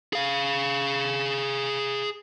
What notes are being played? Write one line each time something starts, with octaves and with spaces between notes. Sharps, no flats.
G#4 F5